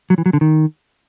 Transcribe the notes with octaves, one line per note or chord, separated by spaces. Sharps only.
F#3
E3
F#3
D3
D#3